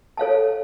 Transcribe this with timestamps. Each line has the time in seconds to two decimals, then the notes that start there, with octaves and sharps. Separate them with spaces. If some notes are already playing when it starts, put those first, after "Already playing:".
0.17 A4 C#5 F5 A5